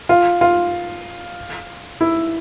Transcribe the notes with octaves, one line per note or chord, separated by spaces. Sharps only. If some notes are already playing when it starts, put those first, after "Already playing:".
F4
F4
E4